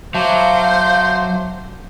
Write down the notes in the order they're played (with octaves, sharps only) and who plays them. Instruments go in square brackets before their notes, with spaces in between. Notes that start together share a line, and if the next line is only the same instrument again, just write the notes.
[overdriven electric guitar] F#3 [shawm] C5 [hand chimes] E5 A5 D6 [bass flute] F5